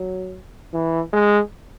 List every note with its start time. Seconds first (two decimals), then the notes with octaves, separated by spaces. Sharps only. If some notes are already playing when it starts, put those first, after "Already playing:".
Already playing: F#3
0.74 E3
1.13 G#3